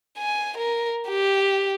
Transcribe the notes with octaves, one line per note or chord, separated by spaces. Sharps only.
G#5
A#4
G4